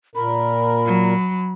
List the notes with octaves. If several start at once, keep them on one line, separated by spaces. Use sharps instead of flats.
A#2 A#4 B5
F#3